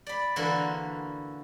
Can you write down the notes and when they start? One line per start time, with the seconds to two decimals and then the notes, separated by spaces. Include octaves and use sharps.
0.07 D5 B5
0.36 D3 E3 A#3 E4 F#4 C6